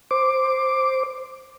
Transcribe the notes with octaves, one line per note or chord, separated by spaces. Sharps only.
C5 D6